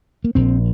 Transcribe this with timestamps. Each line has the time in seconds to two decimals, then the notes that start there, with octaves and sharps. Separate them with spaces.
0.24 A#3
0.35 A#1 A#2 C4